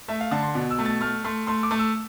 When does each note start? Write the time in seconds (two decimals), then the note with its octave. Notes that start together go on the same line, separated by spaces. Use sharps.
0.08 A3 E5
0.20 F5
0.31 D3 A5
0.43 C6
0.55 B2
0.71 E6
0.79 A3
0.85 A6
1.01 A3 F6
1.24 A3 C6
1.47 A3 C6
1.63 D6
1.71 A3
1.79 E6